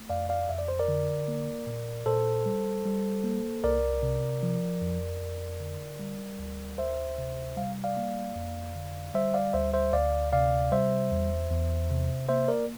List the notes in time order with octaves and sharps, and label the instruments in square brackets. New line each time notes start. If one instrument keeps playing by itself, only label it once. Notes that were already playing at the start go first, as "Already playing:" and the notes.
Already playing: [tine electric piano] A3
F2 D5 F5
D5 F5
F2 E5
D5
C5
A#4 D5
D3
A#3
A#2
A#2 A4 C5
G3
G3
A#3
C2 A#4 D5
C3
F3
F2
F2
D3
G3
D2
D2 C5 E5
C3
G3 F5
D5 F5
A#3
F2
D3
G3 C5 E5
D5 F5
D2 C5 E5
C5 E5
D2 D5 F5
C3 D5 F5
G3 C5 E5
E2
E2
C3
A#3 C5 E5
A#4 D5